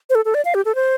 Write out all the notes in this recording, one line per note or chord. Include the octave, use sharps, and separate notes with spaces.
C5
A4
A4
D5
F5
G4
A4
C5